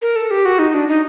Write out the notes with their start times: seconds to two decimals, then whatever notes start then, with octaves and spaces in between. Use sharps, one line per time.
0.02 A#4
0.16 A4
0.31 G4
0.45 F#4
0.59 D#4
0.74 D4
0.88 D#4